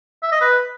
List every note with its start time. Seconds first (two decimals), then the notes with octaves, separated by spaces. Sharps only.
0.23 E5
0.32 D#5
0.41 B4